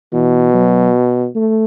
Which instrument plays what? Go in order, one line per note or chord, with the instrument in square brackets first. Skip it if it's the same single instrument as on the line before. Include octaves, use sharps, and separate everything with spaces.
[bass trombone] B2 [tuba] E3
[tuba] F#3
A3